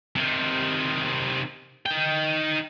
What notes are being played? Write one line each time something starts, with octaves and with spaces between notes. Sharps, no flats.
C3 D#3
D#4 G5